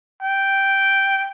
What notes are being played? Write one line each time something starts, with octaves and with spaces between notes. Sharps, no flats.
G5